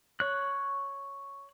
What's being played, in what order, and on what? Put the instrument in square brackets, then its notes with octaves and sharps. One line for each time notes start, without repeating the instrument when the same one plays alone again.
[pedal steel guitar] C#5 F#6